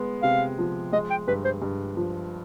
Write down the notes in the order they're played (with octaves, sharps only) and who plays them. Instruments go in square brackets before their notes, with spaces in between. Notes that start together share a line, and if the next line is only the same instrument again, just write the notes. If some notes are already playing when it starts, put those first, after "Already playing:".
Already playing: [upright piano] G#3 B3
[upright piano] C3 [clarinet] F5
[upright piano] F3
[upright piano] G#3 [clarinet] D#5
[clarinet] G5
[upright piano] G2 [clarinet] B4
[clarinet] C5
[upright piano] G2
F3